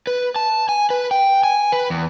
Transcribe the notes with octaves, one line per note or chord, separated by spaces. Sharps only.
B4
A5
G#5
B4
G5
G#5
B4
E2